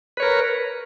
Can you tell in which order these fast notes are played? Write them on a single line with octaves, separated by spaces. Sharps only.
B4 C#5 A#4